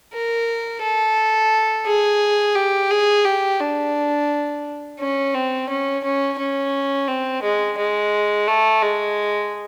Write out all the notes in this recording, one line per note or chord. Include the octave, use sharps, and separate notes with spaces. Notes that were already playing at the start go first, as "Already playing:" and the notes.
A#4
A4
G#4
G4
G#4
G4
D4
C#4
C4
C#4
C#4
C#4
C4
G#3
G#3
A3
G#3